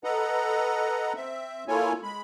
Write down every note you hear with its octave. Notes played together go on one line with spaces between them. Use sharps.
A4 B4 D#5 F#5 A#5
C4 E5
A#3 E4 F4 A4 C#5 G#5
G#3 B5